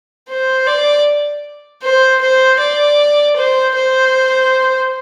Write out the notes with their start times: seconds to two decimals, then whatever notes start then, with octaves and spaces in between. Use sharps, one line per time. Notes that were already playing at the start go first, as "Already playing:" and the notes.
0.29 C5
0.67 D5
1.82 C5
2.21 C5
2.59 D5
3.36 C5
3.75 C5